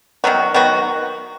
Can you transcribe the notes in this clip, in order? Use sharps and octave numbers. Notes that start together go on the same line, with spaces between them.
D#3 F#3 B3 F#4
D#3 F#3 B3 F#4